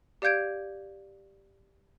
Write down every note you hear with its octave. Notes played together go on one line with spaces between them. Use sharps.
G4 D5 F5 G6 G#6 D7